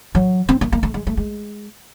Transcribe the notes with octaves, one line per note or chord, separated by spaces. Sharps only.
F#3
C4
A#3
A#3
A3
G#3
A3
G#3